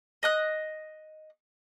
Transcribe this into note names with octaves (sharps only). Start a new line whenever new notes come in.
D#5 D#6 F#6